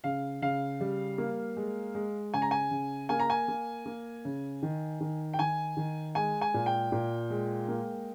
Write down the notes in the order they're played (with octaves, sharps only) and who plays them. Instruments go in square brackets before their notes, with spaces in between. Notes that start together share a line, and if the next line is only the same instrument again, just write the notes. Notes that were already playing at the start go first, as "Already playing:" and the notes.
[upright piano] C#3 F5
C#3 F5
G3
A#3
G#3
G#3
C#3 G#5
A#5
G#5
C#3
A#3 G#5
A#5
G#5
A#3
A#3
C#3
D#3
D#3
G5
D#3 G#5
D#3
G#3 G#5
G#5
A#2
G5
A#2
G#3
A#3